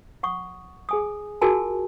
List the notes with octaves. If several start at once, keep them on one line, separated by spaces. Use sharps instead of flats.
F#5 C#6 D#6
G#4 G#5 D#6
F4 F#4 G#4 A#4 G#5 A5